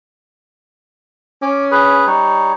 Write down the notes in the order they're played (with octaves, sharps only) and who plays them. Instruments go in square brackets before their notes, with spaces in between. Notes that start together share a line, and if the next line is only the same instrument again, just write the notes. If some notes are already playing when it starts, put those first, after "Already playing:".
[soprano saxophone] C#4 [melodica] D6
[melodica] G#4 B4
G3 D#4 C#5